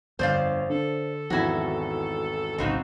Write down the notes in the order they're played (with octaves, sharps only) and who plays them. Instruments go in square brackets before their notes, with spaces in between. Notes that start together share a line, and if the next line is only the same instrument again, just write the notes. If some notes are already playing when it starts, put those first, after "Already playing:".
[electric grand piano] G1 A6 [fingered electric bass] F2 D3 [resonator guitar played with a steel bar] C5 D5 F5
[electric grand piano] D3 [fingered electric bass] D4 [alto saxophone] A4
[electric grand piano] G#1 E2 G#6 [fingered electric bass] F3 [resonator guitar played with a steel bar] E4 F#4
[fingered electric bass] F#1 B1 A2 [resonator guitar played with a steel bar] C#3 F#3 C4 [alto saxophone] D#4